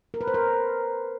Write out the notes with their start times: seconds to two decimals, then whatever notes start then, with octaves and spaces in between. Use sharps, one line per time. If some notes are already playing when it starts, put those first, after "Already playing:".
0.14 A#4
0.21 B4
0.27 C5
0.34 A#4